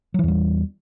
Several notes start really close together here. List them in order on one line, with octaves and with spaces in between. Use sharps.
F#3 E3 E2 G3